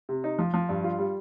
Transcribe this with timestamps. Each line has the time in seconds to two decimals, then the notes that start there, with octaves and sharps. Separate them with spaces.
0.09 C3
0.24 D#4
0.39 F3
0.54 F3
0.69 G2
0.84 F4
0.99 G3